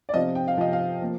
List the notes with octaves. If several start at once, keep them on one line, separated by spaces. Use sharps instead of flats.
D5
C3 F3 C4 F4 D#5
G5
F5
C3 F3 C4 F4 D#5
F5
F3 A#3